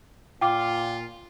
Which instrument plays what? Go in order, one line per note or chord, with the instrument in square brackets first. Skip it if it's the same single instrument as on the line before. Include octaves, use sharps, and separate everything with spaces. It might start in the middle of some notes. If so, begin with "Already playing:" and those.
[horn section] A#2 F4 [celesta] G5 D6